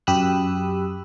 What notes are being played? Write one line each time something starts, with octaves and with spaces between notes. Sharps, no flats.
F#2 G4 B5 D#6 E6 F#6